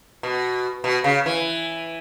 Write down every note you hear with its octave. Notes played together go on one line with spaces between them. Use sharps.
B2
B2
C#3
E3